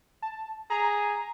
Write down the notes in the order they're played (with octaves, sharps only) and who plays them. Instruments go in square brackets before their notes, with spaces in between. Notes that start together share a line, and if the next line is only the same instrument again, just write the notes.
[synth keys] A5
[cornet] G#4 [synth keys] A#5